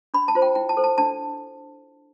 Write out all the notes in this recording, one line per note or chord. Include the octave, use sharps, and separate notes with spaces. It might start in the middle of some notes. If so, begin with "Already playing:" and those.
D4 B5
A5
F4 C5
G5
E4 G5
A5
A4 C5
A5
D4 A5